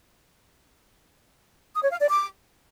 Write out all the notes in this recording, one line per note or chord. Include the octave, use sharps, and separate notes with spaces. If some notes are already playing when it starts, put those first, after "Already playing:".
D#6
C#5
F5
D5
D6